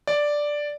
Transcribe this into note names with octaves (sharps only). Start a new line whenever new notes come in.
D5